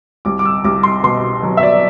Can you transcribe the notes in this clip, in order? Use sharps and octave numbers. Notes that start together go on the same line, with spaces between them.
C2 D6
D6
E6
C2 D6
C6
B2 C6
F#3
E5
D5